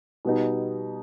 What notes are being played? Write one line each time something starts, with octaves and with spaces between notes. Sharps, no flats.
B2 G3 B3 D#4